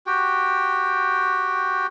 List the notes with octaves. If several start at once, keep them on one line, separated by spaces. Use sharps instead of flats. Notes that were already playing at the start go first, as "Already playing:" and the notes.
F#4 G4 G5